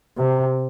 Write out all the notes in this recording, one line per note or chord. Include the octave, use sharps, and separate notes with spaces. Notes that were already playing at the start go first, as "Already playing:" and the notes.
C3